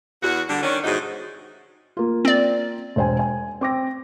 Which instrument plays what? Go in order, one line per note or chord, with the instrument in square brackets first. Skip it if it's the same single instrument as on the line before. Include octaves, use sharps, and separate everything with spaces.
[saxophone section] E2 F#4
D3 G3
D#3 C#4 D4
E2 G#2 C3 D#4 F#4 G#4
[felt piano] A#3 F4
[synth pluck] C4 D5
[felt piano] E1 C5 G#5
G#5
C4 D6 A#6